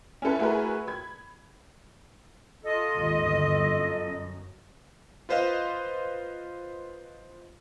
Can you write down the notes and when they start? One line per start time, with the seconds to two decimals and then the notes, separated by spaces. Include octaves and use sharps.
0.22 C#4 E4 A4 B4
0.39 A3 E4 F#4 G#4 A#4 B4
0.87 B5 G#6
2.65 F4 A4 D#5
2.95 G#1 D#2
3.24 G1 D#2 E3
3.66 F#2
5.29 F4 B4 C5 D#5 F5